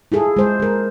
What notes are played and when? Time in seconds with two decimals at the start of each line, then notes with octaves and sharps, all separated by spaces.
0.12 E4 F4 G#4 A4
0.36 G#3 C5
0.60 G#3 A#4